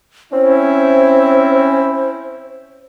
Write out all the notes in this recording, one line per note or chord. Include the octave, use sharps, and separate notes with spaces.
C4 C#4 E4 C5